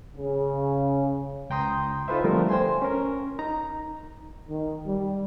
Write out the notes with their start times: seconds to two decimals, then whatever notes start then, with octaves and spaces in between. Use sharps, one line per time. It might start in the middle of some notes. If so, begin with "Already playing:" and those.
0.17 C#3
1.50 C#2 G5 A#5 C6 D#6 G6
2.08 D#4 F4 A4 B4 C5 E5
2.24 D3 F3 G3 A3 B3 A#4
2.49 C5 G5 G#5 C6
2.82 C#4 A#4
3.39 D#4 A#5
4.49 D#3
4.86 G3